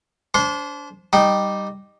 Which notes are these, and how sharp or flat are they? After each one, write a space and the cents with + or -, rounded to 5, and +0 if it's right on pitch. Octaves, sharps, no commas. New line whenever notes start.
D4 -30 C5 +0 C6 +0
G3 +0 D#4 -15 G5 +0